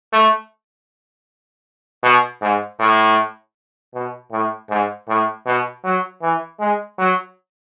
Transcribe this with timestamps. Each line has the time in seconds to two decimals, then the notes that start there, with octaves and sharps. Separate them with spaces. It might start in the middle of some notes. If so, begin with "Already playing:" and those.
0.13 A3
2.03 B2
2.42 G#2
2.80 A2
3.94 B2
4.31 A2
4.70 G#2
5.08 A2
5.46 B2
5.84 F#3
6.22 E3
6.60 G#3
6.99 F#3